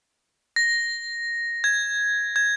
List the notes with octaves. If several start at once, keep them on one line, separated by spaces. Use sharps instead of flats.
A#6
G#6
G#6